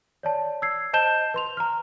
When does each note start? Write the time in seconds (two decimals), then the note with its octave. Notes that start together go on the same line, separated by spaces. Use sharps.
0.23 C#5 D5 A5
0.62 E6 G#6 C7
0.93 C5 D#5 A5 G6 E7 G7
1.34 B4 C6 F7
1.57 A#5 F6